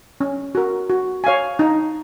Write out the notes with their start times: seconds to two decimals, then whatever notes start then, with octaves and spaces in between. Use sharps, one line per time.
0.20 C#4
0.55 F#4 A#4
0.90 F#4
1.24 C#5 F5 G#5
1.59 D#4